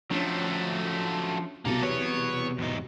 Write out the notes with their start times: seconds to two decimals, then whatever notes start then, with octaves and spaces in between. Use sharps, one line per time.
0.11 F3 F#3 A3 C#4 D4
1.65 C2 B2 F#3 A#3 A4
1.83 E3 B3 C#5
2.58 E2 G#2 D#4